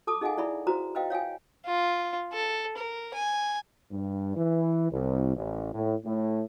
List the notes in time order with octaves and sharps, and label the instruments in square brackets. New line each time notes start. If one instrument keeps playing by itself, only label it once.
[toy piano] A4 A5 D6 D#6
D#4 G#4 D#5 F5 F#5 G#5
E4 D5 E5 B5
E4 F#4 B4 C5 A#5
B4 C5 D#5 F5 G5
C#5 F5 G5 G#5
[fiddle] F4
A4
A#4
G#5
[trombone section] G2
E3
C2
A1
A2
A2